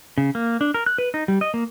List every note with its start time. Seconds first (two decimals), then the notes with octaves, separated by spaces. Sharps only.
0.18 C#3
0.35 A#3
0.61 D4
0.74 A#4
0.86 F#6
0.98 B4
1.14 D#4
1.28 G3
1.41 D#5
1.54 A#3